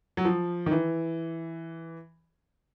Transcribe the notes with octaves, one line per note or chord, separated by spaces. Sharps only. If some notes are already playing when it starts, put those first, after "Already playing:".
F#3
F3
D#3
E3